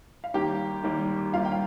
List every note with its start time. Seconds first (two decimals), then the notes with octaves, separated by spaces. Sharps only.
0.24 F5
0.34 D#2 D#3 G3 A#3 G4 G5
0.84 D#2 D#3 G3 A#3
1.33 D#2 D#3 G3 A#3 F4 F5
1.45 G5
1.52 F5